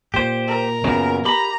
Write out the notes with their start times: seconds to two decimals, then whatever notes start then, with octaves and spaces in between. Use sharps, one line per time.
0.14 A#2 G4 C5
0.47 A#4
0.84 F#2 A#2 C#3 B3
1.25 G4 A#5 B5